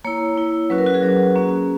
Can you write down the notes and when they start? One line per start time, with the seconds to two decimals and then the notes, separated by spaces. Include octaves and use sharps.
0.05 A#3 E4 C#5
0.37 A#3 E4
0.70 F#3 C#4 F#4 B4
0.78 A#4
0.86 F#4
0.94 G#4
1.03 F#3 C#4 F#4
1.35 A#3 C#4 F#4